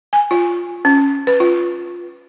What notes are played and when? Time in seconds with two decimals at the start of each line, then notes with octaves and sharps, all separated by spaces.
0.13 G#5
0.31 F4
0.85 C#4
1.27 B4
1.40 F4